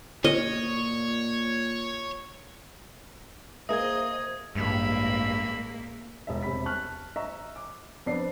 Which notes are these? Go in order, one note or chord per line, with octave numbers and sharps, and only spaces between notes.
A#2 C#5 D#5
A#3 G#4 A#4 C5 D#5 E5 D#6 G#6
A1 G2 G#3 A#3 E5 B5
E1 E5
E1 C3 G3 B5 B6
A5 C#6 F6 F#6
D#5 E5 A#5 C#6
D6
F2 B3 D4 D5 C7